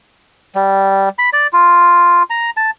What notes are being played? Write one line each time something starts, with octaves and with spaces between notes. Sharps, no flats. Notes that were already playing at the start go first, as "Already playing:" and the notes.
G3
B5
D5
F4
A#5
A5